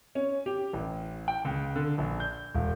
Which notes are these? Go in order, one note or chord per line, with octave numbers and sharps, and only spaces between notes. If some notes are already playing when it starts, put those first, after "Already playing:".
C#4
G4
A1
G5
C#2
D3
A#1
G6
E1